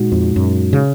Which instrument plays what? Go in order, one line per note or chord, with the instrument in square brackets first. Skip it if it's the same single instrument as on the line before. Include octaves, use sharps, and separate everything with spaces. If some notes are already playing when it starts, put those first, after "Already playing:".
Already playing: [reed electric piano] A#2 G#3 D#4 F#4
[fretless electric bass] F2
F#2
C#3